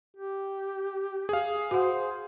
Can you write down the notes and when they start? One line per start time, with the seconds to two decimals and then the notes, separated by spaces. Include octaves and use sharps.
0.16 G4
1.29 G#4 F5
1.71 F#4 C5 F#5